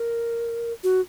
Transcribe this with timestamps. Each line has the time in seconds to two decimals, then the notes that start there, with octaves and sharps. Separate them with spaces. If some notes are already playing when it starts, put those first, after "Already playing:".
Already playing: A#4
0.84 F#4